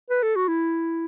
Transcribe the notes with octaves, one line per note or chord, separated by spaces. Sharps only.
B4
A4
F#4
E4